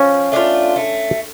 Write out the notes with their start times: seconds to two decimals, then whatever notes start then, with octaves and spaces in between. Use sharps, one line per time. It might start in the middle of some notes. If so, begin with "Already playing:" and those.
Already playing: F3 C#4
0.32 A3 D4 F4
0.76 A3